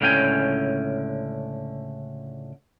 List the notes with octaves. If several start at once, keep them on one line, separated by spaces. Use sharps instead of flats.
C#2 A2 D3 C#4 G5 G#5